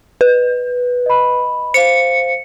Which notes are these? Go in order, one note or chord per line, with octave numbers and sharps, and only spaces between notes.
B4
D#5 B5
C5 F5 C#7